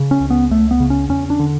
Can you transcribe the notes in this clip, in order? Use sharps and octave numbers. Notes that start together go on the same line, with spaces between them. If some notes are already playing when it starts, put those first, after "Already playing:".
Already playing: C#3
C#4
C#2
B3
C#2 A3
B3
C#3
C#4
E2 C#4
D4
D3